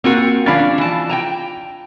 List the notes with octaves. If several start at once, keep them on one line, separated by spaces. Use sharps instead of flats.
A#3 C4 F4 F#4
F3 C#4 D4 F5 B5 A6
E3 A5
G5 G#5 A#5